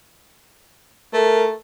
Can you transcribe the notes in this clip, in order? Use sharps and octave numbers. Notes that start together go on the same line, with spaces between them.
A3 A#4